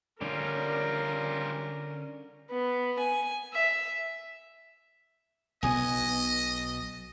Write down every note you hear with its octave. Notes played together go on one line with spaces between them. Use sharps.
D3 G3 C#4 F4 A#4
B3
G#5
E5
B1 B2 B3 D#5 G#5 D#6